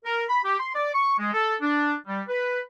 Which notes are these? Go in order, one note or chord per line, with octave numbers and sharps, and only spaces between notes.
A#4
B5
G4
C6
D5
C#6
G#3
A4
D4
G3
B4